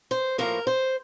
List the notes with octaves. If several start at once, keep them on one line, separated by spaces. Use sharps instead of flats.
C5
A2 F3 A#3 A#4
C5